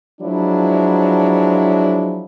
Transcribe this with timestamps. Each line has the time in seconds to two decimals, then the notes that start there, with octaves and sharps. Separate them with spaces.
0.21 F3 F#3 G#3 D4 E4